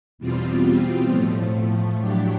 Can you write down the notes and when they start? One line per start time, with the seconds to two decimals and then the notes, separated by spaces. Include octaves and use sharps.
0.18 E2 B2 G3 C4 F4
1.08 A2 F3 A3
1.97 A2 F#3 A3 D4 G4